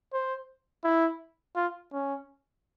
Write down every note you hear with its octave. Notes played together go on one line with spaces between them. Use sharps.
C5
E4
F4
C#4